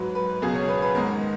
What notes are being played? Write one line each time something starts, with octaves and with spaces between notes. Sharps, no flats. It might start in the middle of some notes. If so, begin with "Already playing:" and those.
Already playing: G#2 F#3 B4
B4
C#2 B2 F#3 G#4
C#5
B4
B4
G#2 D#3 G#3 A#4